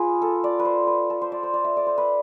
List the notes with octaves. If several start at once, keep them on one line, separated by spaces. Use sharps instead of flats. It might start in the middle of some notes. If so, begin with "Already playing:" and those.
Already playing: F4 G#4 B4
A4
D5
B4
C5
B4
A4
C5
D5
C5
D5
E5
D5
C5
B4